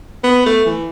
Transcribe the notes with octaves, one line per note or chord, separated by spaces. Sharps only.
B3
A3
E3